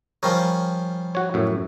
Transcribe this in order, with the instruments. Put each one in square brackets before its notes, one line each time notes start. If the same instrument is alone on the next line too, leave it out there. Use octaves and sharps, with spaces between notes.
[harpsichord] F3 G3 C#4 [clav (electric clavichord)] A#4
[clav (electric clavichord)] F#4 C#5
F#2 A2